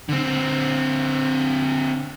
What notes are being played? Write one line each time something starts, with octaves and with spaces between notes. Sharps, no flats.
D3 C4